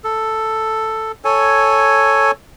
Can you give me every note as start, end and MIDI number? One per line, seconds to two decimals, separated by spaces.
0.04 1.12 69
1.25 2.31 69
1.25 2.31 73
1.25 2.31 80